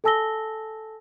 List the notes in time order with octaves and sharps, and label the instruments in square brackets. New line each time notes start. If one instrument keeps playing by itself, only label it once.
[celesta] A4 G#5 A5 E6 A#6 G7